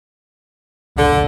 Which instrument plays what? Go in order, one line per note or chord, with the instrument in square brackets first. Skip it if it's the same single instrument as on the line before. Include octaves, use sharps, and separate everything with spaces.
[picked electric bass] F1 C#2 [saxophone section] D3